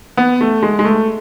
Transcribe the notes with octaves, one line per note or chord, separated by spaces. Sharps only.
B3
A3
G#3
G#3
A3